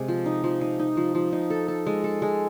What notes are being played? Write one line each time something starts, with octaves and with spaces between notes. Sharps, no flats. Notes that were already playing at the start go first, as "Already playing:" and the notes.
Already playing: C3 G#3
F3
D#4
F3
D#4
D#4
F3
F3
D#4
A4
A4
G#3
A4
G#3